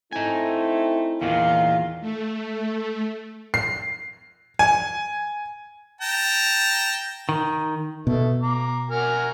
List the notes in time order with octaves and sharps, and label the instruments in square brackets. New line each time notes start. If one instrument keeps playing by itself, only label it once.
[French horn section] A3 C4 E4 [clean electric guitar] D#4 G#5
[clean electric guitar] E2 A#2 D#3 [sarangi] F4
[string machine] A3
[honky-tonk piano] C7
G#5
[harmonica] G5 A5 A#5
[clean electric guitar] D#3
[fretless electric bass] B2 [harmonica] A3
[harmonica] A#5 D6
F#4 A#4 G#5